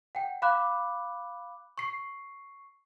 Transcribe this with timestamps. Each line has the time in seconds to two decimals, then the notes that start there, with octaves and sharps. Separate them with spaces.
0.15 F#5 G5
0.42 F5 B5 D6 F#6
1.78 C#6 C7